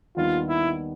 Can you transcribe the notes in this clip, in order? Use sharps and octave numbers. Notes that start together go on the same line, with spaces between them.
D#2 D#3 G3 B3 D4 F4
E4